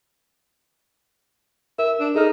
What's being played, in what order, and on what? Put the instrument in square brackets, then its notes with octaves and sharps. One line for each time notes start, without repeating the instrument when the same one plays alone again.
[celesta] A#4 [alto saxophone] E5
[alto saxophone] D4
[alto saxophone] D#4 [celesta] G#4 A4 F6